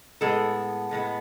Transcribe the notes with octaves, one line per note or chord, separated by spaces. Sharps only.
A2 G#3 B3 A4
A2 G#3 B3